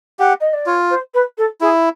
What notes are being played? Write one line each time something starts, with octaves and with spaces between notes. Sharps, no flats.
G4 F#5
D#5
D5
F4 C#5
C5
B4
A4
E4 G#4